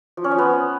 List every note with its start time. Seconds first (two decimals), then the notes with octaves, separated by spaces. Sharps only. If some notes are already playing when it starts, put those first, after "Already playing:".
0.17 F3
0.24 C#4
0.31 F3
0.38 B3